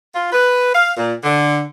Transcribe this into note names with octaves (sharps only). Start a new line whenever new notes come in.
F4
B4
F5
A#2
D3